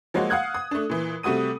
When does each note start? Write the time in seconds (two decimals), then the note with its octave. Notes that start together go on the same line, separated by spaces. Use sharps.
0.14 F3 F#3 G#3 A#3 F#4
0.30 F5 F#5 D#6 F#6 G#6
0.54 D#6
0.71 A3 D4
0.90 A#2 E3
1.23 C3 G3 A3 F#4 D#6 D#7